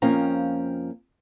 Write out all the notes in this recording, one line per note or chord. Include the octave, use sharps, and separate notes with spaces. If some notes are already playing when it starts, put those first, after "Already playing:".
F2 F3 A#3 C#4 G5 A#5